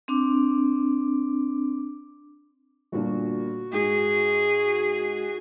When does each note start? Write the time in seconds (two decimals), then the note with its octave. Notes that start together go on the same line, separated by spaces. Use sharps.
0.08 C4 D4 D6
2.92 G1 A#2 D4 F#4
3.73 G#2 G#4